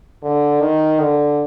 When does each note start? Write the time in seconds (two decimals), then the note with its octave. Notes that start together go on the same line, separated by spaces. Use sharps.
0.23 D3
0.61 D#3
1.00 D3